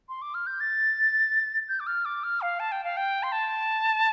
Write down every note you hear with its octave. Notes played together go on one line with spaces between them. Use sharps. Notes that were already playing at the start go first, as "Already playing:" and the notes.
C6
D6
F6
G6
A6
G6
D6
F6
D6
F6
F5
A5
G5
F5
G5
C6
A5